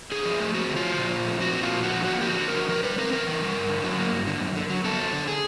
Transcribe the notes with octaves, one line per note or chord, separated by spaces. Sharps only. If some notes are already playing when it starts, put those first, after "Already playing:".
D3 G#4
F3
A3
C4 F#4
D3
F4
F3
A#2
F3
A3
C4 F#4
A#2
F4
F3
D3 F#4
F3
F#4
A#3
G4
D3 F#4
D3
A#4
F3
E3 A#4
G3 B4
C4 A#4
E3 A#4
E3
G3
G2
D3
F#3
A#3
G2
D3
F#2
D3
F#3
B3 A4
F#2
D3
G#4